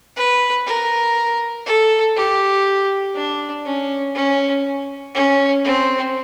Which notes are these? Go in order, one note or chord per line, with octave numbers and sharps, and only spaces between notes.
B4
A#4
A4
G4
D4
C#4
C#4
C#4
C4